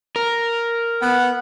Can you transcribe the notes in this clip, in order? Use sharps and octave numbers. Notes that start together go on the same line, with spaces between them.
A#4
B3 F#5